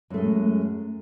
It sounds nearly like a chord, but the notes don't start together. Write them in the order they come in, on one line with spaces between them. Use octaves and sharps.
F#2 A3 G#3